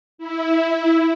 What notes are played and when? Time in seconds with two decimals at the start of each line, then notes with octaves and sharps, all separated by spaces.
0.18 E4